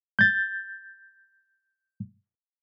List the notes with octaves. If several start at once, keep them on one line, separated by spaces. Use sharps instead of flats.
G6 A6